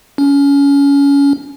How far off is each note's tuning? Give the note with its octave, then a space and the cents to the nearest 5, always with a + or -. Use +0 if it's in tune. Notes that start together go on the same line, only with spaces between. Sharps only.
C#4 +25